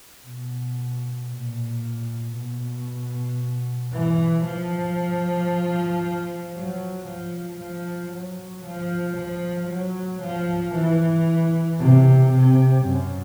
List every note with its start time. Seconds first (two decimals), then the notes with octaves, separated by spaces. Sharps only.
0.25 B2
1.30 A#2
2.36 B2
3.93 E3
4.46 F3
6.55 F#3
7.07 F3
7.60 F3
8.12 F#3
8.65 F3
9.17 F3
9.70 F#3
10.23 F3
10.75 E3
11.79 C3
12.33 C3
12.85 F#2